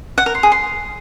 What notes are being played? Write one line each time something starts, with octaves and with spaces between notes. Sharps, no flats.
F#5
A#4
C6
G#4
C6